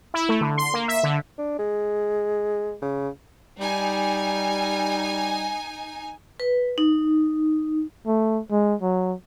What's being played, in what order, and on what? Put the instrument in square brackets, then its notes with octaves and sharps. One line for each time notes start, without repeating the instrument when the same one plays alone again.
[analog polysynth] E4
A3
D3
C6
A#3
E5
D3
[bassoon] D4
G#3
C#3
[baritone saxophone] G3 [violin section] D#4 G#5
[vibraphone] B4
D#4
[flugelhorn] A3
G#3
F#3